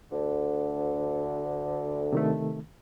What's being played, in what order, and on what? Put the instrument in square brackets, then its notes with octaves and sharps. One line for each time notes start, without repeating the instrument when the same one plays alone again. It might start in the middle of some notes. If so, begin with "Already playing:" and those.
[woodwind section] D2 D3
[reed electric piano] C3 D#3 A3